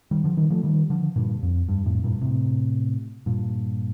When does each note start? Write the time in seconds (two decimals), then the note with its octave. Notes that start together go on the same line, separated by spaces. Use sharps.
0.11 D#3 G3
0.24 D3 F3
0.37 D#3 G3
0.50 F3 A3
0.63 D#3 G3
0.90 D3 F3
1.16 G2 A#2
1.43 F2
1.69 G2
1.86 F2 A2
2.04 G2 A#2
2.21 A2 C3
3.26 G2 A#2